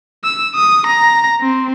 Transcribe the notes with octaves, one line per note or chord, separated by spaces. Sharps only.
E6
D#6
A#5
C4